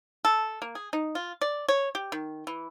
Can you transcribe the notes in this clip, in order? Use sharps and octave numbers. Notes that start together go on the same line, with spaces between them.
A4
A#3
G#4
D#4
F4
D5
C#5
G4
D#3
E3